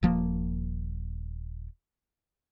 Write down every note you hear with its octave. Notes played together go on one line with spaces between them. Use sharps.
D#1 F3 A#3